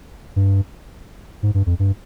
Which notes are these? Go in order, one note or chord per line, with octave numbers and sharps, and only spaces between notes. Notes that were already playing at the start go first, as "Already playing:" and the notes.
G2
G#2
G2
F2
G2